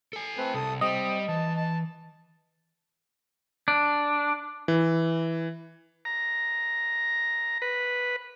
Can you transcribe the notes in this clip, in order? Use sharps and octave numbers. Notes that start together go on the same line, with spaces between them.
A4 G#5
A3 C4 B4
C2 A4 D#6
G3 C4 D#5
E3 A5
A5
D4
E3
A#5
B4